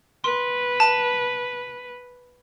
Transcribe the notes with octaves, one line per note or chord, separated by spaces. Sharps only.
B4 C6
A5